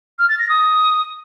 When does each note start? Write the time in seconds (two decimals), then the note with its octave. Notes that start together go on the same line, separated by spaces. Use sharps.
0.19 F6
0.29 A6
0.39 A#6
0.49 D#6